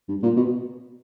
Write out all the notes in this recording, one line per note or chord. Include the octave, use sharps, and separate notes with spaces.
G2
A#2
B2